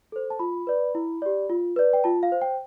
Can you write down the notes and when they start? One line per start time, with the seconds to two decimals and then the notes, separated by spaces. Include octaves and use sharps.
0.12 A4 C5
0.30 A5
0.39 F4 B5
0.67 B4 D5
0.95 E4
1.22 G4 D5
1.50 F4
1.76 B4 D5
1.93 G5
2.04 F4 A5
2.23 F5
2.32 C5
2.42 G5